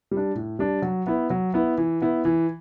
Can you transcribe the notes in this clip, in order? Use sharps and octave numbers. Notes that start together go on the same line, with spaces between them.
G3
D4
A2
G3 D4
F#3
B3 E4
F#3
B3 E4
E3
B3 E4
E3